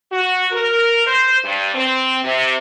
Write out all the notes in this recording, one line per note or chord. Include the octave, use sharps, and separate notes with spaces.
F#4
A#4
C5
G2
C4
C3